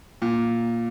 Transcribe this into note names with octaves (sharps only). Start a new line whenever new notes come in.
A#2